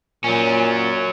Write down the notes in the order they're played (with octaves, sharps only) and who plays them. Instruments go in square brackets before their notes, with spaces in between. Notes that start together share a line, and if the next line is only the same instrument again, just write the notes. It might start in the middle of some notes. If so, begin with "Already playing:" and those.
[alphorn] A#2 [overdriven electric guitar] F#3 C#4